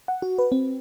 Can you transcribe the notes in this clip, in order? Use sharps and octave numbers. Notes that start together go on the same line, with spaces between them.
F#5
F#4
B4
C4